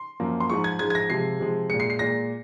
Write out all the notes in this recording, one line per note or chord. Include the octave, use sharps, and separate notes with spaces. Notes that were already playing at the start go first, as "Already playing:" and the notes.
Already playing: C6
F#2 F3 A#3
C6
G#2 F3 G#3 C#6
G#6
G#2 F3 G#3 G#6
G#6
A#6
C3 F3 G#3 C7
C3 F3 G#3
A#2 G#3 C#7
C7
C7
A#2 G#3 A#6